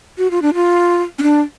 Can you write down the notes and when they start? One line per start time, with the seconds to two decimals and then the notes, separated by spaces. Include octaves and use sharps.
0.18 F#4
0.31 F4
0.42 D4
0.54 F4
1.19 C#4
1.23 D4